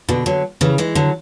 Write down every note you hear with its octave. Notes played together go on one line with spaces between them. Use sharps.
B2 D3
D3 F#3
C#3 E3
E3 G#3
D3 F#3